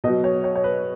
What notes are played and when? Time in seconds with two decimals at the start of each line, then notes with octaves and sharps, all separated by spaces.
0.04 B2 F#3 D#5
0.24 C#5
0.44 C#5
0.55 C#5
0.64 B4